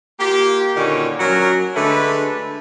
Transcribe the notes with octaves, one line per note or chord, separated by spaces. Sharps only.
A#3 F4 G4
A#2 D3 D#3 C#4 F#4
F#3 C#4 F#4 A#4
D3 G#3 A3 A4 B4